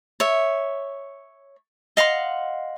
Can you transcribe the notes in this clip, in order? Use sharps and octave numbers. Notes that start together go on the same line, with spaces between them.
C#5 E5
D#5 F5 F#5 C6